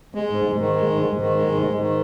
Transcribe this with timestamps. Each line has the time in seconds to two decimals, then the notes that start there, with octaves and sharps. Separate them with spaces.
0.15 G#3
0.30 G#2
0.45 G#2
0.60 D#3
0.75 G#3
0.91 G#2
1.06 G#2
1.21 D#3
1.36 G#3
1.52 G#2
1.67 G#2
1.82 D#3